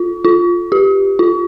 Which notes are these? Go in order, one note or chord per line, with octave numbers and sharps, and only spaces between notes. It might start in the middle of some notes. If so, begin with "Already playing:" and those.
Already playing: F4
F4
G4
F4